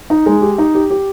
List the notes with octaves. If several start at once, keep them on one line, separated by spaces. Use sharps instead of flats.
D#4
G#3
G4
D#4
G4
G4